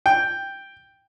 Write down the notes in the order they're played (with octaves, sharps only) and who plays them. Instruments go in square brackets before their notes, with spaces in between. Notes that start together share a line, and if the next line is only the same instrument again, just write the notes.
[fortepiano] G5